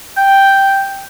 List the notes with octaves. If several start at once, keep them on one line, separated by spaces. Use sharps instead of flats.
G5